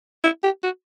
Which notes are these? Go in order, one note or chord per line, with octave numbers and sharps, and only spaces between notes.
E4
G4
F#4